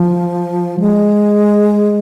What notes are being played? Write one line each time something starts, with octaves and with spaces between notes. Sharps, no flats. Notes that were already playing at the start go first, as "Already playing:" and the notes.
Already playing: F3
G#3